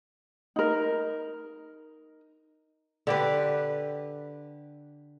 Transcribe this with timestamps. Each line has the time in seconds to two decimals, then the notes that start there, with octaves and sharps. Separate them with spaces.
0.56 D#4 A#4
3.07 D3 G4 B4